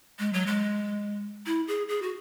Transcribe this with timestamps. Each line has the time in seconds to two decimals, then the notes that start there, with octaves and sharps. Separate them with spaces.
0.19 G#3
0.33 F#3
0.47 G#3
1.46 E4
1.68 G#4
1.89 G#4
2.02 F#4